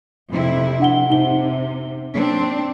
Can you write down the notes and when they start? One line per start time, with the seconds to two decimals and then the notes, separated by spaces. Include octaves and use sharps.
0.29 F2 C3 E4
0.80 D4 F#5 G7
1.10 C3 D#4 G7
2.13 C4 D4